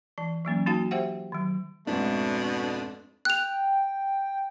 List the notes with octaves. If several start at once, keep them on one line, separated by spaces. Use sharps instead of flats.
E3 A5
E3 F#3 A#3 C#4
A#3 D#4 F#4 F5 A5
G4 C5 E5 F#5 G5
D#3 F#3
F2 G#2 B2 A3 D4
G5 F#6 F7